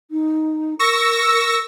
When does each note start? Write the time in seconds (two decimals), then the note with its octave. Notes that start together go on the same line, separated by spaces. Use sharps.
0.11 D#4
0.79 A#4 C#6 E6 A#6